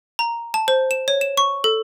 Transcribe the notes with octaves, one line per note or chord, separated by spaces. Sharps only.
A#5
A5
C5
E7
C#5
E7
C#6
A4